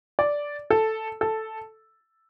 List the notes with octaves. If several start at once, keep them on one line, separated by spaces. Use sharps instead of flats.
D5
A4
A4